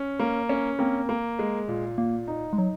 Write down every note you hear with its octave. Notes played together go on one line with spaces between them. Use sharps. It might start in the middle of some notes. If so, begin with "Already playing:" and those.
Already playing: C#4
A#3
C#4
A#3 C4
A#3
G#3
A#2
A#2 A#3
D#4
G#3
F#3 D#4